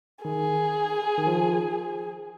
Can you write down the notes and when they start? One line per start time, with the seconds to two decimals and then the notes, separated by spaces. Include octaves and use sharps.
0.25 D#3 G#4
1.18 D#3
1.27 F3